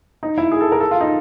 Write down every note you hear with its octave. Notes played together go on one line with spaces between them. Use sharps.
D#4
E4
G#4
A4
A#4
A4
F4
D#4